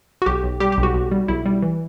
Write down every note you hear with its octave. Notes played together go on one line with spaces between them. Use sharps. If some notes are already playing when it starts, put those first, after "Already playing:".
F#4
B1 G4
B1
G3 G4
G4
B1
F#4
B1
G3
B1 E4
G3
E3